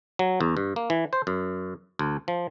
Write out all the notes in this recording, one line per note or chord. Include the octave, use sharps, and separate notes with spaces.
F#3
E2
G2
A#3
E3
C5
F#2
D2
F3